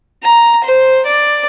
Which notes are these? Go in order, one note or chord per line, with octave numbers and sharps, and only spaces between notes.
A#5
C5
D5